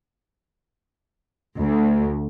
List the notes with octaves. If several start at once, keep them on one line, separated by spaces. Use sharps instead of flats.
D2